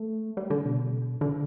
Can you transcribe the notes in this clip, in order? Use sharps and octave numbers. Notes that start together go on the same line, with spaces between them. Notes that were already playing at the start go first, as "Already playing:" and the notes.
Already playing: A3
G3
D3
B2
D3